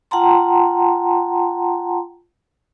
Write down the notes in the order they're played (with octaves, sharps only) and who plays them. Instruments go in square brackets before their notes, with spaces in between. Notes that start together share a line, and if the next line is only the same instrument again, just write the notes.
[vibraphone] F4 F#5 G5 A5 A#5 C6